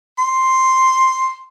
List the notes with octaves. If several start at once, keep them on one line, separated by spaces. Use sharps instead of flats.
C6